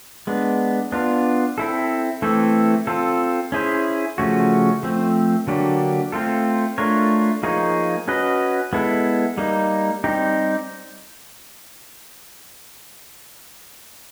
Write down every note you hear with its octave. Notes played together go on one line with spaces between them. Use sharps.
G#3 B3 D4
B3 D4 F4
C4 E4 A4
E3 A3 C4 E4 A4
C4 F4 A4
C#4 E4 G#4 C5
C#3 F3 A3 C#4 F#4
F3 A3 C4
D3 F#3 A#3 D4 G4
A3 C4 F4 A4
A3 D4 F4 A#4 C#5
F3 A#3 D#4 G#4 C#5
C#4 F#4 B4 D#5
G#3 B3 E4 A4
G3 A#3 D#4
G3 C4 D#4 G4